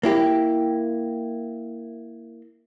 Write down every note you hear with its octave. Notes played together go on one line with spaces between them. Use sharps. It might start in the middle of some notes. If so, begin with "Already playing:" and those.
A#3 E4 G4